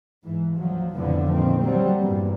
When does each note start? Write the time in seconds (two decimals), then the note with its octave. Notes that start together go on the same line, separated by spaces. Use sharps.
0.24 G#2 E3
0.57 D2 F3 F#3
0.93 F2 A2 D3 E3 F3 B3
1.32 A#2 D#3 C4
1.60 F#3 G3 C4
2.01 E2 G2 A#2